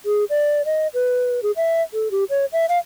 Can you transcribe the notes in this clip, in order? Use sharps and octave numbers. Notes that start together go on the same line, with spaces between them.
G#4
D5
D#5
B4
G#4
E5
A4
G4
C#5
E5
F5